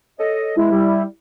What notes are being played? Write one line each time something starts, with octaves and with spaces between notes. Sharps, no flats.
A4 C#5 D#5
E2 G#3 E4
G3